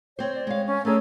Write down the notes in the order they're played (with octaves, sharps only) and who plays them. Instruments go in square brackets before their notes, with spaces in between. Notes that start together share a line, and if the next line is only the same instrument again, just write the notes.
[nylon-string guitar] C4 C5 [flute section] C#5
[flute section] D5
[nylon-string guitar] G#3 F5 [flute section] C#5
[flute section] C#4
[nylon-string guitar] A3 C#4 D4 [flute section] G#4 A#4 E6